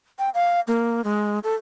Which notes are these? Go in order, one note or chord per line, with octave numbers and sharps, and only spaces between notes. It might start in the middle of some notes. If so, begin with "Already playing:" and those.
G5
F5
A#3
G#3
A4